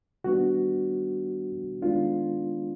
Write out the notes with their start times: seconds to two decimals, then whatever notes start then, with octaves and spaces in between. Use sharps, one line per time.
0.24 D#3 G3 B3 D4 F#4
1.82 D#3 G#3 B3 D4 F4